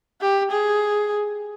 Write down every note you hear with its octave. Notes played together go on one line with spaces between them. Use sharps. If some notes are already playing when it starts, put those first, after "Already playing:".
G4
G#4